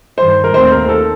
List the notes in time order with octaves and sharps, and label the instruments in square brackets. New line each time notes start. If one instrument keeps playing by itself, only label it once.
[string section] G2 D#3 G3 [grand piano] C5
[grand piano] A#4
[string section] D#2 D#3 A3 C4 [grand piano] C5
[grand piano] A#4
A4